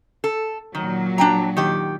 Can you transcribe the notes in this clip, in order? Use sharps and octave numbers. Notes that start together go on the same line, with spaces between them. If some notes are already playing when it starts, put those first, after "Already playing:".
A4
A#2 D#3 F#3
D4 G5 A#5
D#3 G4